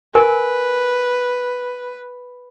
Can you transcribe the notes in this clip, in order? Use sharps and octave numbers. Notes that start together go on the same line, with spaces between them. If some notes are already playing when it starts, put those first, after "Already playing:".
A#4 B4 G#5